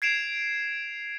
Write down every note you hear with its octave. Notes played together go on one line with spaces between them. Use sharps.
G#6 C7 D7 E7 F7